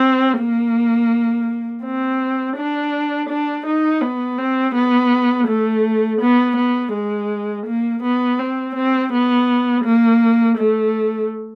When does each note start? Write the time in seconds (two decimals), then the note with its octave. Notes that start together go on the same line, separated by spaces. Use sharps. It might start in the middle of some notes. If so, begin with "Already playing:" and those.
Already playing: C4
0.38 A#3
1.84 C4
2.57 D4
3.29 D4
3.66 D#4
4.02 B3
4.38 C4
4.75 B3
5.47 A3
6.21 B3
6.56 B3
6.93 G#3
7.66 A#3
8.03 B3
8.39 C4
8.75 C4
9.12 B3
9.85 A#3
10.58 A3